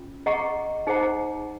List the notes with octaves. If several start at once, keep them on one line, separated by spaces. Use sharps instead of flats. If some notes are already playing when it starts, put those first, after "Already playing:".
Already playing: C#4 F4
G#4 D#5 F#5 A#5 C#6
D#4 G#4 C5 F#5 A#5